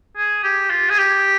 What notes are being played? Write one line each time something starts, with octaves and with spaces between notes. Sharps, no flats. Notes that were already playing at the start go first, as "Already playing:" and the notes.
G#4
G4
F4
G#4
G4